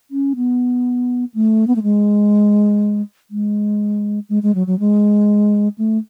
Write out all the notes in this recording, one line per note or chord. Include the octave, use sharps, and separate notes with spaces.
C#4
B3
A3
B3
A3
G#3
G#3
G#3
G#3
F#3
F#3
G#3
A3